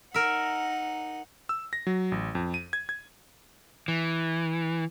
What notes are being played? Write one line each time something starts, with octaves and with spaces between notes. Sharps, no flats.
D#4 A#4 E5 F#5
E6
A#6
F#3
A1
F2
D#7
G#6
G#6
E3